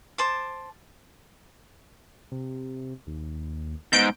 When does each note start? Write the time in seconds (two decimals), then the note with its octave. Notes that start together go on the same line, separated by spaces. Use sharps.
0.18 C5 A5 D6
2.32 C3
3.07 D#2
3.93 G#2 B3 G6 D7